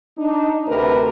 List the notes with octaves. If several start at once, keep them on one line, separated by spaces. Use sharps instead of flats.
D4 D#4
D2 C3 A#4 B4